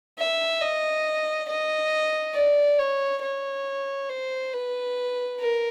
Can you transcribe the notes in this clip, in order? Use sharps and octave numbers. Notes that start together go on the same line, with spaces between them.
E5
D#5
D#5
D5
C#5
C#5
C5
B4
A#4